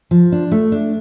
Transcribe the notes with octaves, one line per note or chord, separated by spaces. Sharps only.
F3
D4
A3
D4